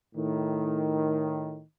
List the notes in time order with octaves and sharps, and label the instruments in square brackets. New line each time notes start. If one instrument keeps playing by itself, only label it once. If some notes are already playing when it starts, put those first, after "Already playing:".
[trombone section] A2 D#3